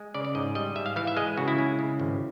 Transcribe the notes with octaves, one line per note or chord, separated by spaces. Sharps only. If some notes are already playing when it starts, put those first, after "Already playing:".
Already playing: G#3
C#3 D5
D5
G#2 D#5
G3 D#5
G#2 E5
F5
E3 F5
E5
G#3 D#5
C#3 F#4
E4
G#3
C#3
G#1